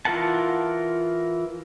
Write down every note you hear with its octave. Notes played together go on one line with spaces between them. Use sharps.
E3 F4 A#4 F#5 A5